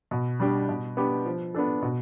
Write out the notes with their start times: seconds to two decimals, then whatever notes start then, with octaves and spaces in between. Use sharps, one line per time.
0.11 B2
0.40 G3 D4 G4
0.69 B2
0.97 B3 D4 G4
1.26 F3
1.54 B3 D4 A4
1.82 B2